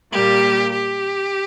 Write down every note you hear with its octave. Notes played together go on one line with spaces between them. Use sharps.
A#2 G3 A#3 G4
G4